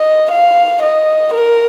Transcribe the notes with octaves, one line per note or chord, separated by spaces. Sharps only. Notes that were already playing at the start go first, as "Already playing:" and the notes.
Already playing: D#5
F5
D#5
A#4